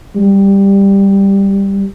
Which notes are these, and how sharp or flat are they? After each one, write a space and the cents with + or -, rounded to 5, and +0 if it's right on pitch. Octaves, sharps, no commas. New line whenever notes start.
G3 +10